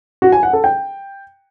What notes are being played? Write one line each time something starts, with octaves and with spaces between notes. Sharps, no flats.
F#4
G#5
F#5
A4
G5